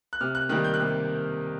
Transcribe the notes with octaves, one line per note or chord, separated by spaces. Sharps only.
F#6
C3 F6
F#6
D#3 G3 A#3 F#6
G6
F#6
C3